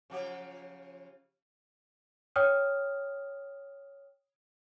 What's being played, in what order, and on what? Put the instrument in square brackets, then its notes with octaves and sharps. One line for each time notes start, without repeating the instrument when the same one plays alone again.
[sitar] C#3 F3 G4
[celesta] C#5 G5 D#6 F6